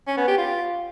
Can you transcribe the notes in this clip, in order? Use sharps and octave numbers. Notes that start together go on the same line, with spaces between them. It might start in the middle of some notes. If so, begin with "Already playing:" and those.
C#4
B3
G4
F4